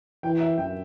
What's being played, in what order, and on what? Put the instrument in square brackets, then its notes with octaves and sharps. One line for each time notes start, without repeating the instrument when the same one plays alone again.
[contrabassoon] E3 [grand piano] G5
[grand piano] E5
[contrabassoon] F#2 [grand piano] G5